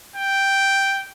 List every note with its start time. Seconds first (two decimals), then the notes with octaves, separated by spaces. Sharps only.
0.16 G5